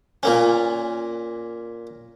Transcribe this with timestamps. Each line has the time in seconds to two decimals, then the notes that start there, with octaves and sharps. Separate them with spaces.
0.23 A#2 A#3 C#4